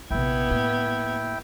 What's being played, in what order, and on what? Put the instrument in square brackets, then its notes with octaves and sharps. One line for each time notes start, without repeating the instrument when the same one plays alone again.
[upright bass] A#1 C3 [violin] B3 G#6 [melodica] E4 G5
[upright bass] A2 A#3